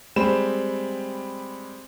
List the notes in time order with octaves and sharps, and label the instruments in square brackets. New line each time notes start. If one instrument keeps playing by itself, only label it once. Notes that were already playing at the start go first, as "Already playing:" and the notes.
[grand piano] G3 G#3 C4 B5 E7